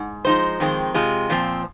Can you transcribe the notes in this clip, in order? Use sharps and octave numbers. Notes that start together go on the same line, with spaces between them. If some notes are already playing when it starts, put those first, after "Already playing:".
Already playing: G#2
F3 G#3 D#4 C5
F2 D#3 G#3 C4
C3 G#3 F4
A#2 F3 C4